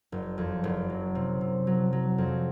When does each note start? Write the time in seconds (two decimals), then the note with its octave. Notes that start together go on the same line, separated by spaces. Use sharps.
0.12 F#1
0.38 F2
0.64 F#1
0.90 F#3
1.15 C3
1.41 C3
1.67 F#3
1.93 F#3
2.18 F2